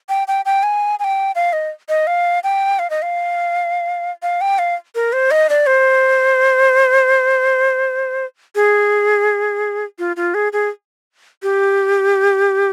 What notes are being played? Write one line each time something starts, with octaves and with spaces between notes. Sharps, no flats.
G5
G5
G5
G#5
G#5
G5
F5
D#5
D#5
F5
G5
F5
D#5
F5
F5
G5
F5
A#4
C5
D#5
D5
C5
G#4
F4
F4
G#4
G#4
G4